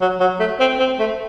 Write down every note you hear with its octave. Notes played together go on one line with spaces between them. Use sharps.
F#3
F#3
A3
C4
C4
A3